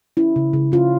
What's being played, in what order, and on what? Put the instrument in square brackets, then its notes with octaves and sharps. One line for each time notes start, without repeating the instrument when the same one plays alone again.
[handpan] C#4 E4
C#3
C#3
C#4 F4